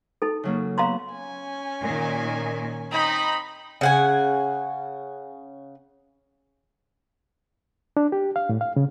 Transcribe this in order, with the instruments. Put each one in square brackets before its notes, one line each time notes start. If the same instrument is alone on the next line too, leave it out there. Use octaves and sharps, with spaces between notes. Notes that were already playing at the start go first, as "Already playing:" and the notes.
[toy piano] D#4 A4
[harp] C#3 F#3 A#3
[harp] B3 [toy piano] F5 A#5 C6
[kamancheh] C#4 G#5
[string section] A#2 D#3
[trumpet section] C4 D#4 [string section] B5
[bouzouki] C#3 F#5 G#5
[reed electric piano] D4
G4
F5
A2
F5
C#3